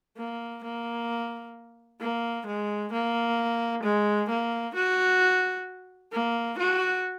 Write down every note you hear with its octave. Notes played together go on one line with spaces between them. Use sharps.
A#3
A#3
A#3
G#3
A#3
G#3
A#3
F#4
A#3
F#4